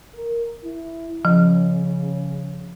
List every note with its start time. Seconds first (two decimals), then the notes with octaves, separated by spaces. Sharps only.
0.14 A#4
0.64 E4
1.25 C#3 F3